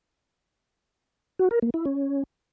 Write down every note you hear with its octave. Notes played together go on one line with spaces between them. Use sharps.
F#4
A#4
A#3
E4
C#4